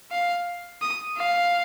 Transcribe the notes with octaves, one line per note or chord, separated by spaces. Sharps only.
F5
D#6
F5